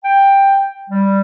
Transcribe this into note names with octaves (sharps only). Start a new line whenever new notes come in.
G5
G3